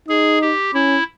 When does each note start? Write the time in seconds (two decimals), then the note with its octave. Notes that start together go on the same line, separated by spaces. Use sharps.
0.08 D#4 G#4
0.41 G4
0.74 C#4 E4